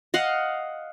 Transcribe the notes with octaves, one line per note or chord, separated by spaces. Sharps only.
D#5 F5 F#5